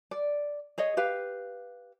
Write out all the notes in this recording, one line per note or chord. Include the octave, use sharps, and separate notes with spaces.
D5
G#4 C#5 D#5
G4 B4 F5